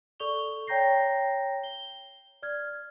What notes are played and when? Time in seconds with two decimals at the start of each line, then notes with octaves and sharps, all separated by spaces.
0.20 A4 D5 C#6 F7 G7
0.67 C#5 G5 A#5 G6 A#6 C7
1.64 G7
2.43 D5 F6 G#6